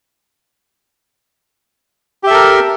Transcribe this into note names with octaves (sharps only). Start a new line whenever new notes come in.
G4 A4 A#4 E5